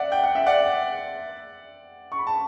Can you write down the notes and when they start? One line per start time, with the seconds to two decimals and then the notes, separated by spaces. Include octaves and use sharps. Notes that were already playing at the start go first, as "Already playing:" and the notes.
Already playing: D5 E5 F#5
0.12 G5
0.24 F#5
0.35 E5
0.46 D5 F#5
2.12 C#6
2.19 B5
2.27 A5